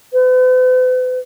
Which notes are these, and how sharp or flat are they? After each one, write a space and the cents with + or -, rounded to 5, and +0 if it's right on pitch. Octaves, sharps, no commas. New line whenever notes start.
B4 +45